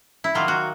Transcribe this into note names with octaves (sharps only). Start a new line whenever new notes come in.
E4
D#3 F#3 A#3 F4
F#4